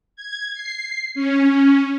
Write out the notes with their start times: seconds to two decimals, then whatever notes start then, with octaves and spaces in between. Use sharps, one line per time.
0.16 G#6
0.54 C7
1.15 C#4